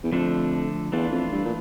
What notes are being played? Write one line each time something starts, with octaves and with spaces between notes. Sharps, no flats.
E2
F2 D3 F3 A3 D4 A4
E2 E3 A3 D4 F4
F2
G2
A#2